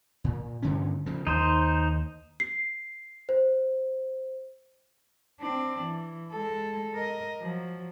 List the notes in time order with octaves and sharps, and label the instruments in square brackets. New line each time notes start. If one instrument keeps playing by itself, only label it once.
[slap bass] A#2
G2 D3 C#4
C#3 F3
[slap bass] D#2 [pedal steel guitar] D#4 C5
[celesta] C7
C5
[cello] C4 D4
E3
G#3 A4
A#4 D#5
F3 F#3